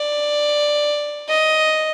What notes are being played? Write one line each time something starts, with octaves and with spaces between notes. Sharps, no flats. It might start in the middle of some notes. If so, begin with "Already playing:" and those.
Already playing: D5
D#5